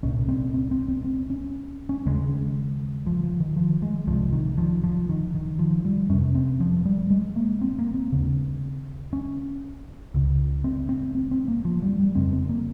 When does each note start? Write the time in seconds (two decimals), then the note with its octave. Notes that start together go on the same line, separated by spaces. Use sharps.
0.03 C2 A#2 C#4
0.28 C4
0.54 C4
0.71 C4
0.88 C4
1.04 C4
1.30 C#4
1.89 C#4
2.05 D#2 C#3 G#3
3.07 F3
3.23 F3
3.40 D#3
3.56 F3
3.82 G#3
4.07 C2 C3 F3
4.33 D#3
4.58 F3
4.83 F3
5.09 D#3
5.34 D#3
5.59 F3
5.85 G3
6.09 F2 C3 C#4
6.35 C4
6.60 F3
6.85 G3
7.10 G#3
7.36 A#3
7.61 C4
7.78 A#3
7.94 C4
8.12 D#2 C#3
9.13 C#4
10.14 C#2 C#3
10.64 C4
10.89 C4
11.15 C4
11.31 C4
11.48 A#3
11.65 F3
11.82 G3
11.99 G3
12.15 F2 C#3 C4
12.33 C4
12.49 A#3